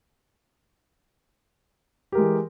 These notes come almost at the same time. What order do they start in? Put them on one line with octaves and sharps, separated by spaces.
G4 A#4 G#3 E3